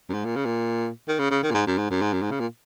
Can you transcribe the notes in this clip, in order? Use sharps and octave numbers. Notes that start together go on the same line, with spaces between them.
F#2
G#2
A#2
C#3
A#2
D#3
C#3
C#3
D#3
A#2
G#2
F#2
G#2
F#2
G#2
F#2
G#2
C#3
A#2